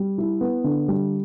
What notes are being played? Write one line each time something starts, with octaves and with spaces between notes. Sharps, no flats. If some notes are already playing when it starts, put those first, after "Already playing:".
Already playing: G3
E4
B3
D3
G3